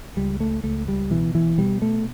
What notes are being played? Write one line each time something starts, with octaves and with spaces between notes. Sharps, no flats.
C#2 G3
A3
C#2 A3
G3
B2 E3
E3
B2 G3
A3